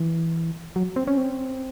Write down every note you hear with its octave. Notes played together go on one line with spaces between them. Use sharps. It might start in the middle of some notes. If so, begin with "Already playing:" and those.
Already playing: E3
F#3
C4
C#4
C4